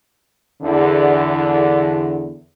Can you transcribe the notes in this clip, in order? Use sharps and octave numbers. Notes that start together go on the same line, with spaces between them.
E2 D3